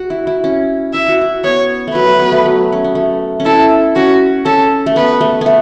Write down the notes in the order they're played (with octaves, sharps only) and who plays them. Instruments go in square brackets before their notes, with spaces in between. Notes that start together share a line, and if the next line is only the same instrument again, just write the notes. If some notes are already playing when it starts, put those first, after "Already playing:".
Already playing: [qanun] F#4
E4
E4
C#4
[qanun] E4 [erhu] E5
[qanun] F#4
E4
[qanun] B3 [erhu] C#5
[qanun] A3
[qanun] F#3 [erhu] B4
[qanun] A3
B3
A3
F#3
C#4
B3
A3
C#4
[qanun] E4 [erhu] A4
[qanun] C#4 [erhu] F#4
[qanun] C#4 [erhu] A4
[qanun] A3
[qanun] B3 [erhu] B4
[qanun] A3
A3 B3